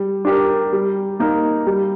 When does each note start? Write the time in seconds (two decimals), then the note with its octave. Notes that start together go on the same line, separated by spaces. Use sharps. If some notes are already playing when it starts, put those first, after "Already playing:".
Already playing: G3
0.25 D4 G4 A#4
0.73 G3
1.20 A#3 D#4 A#4
1.67 G3